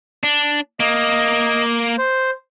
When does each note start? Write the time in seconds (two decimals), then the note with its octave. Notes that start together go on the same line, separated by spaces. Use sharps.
0.23 D4
0.80 A#3 D#5
1.98 C5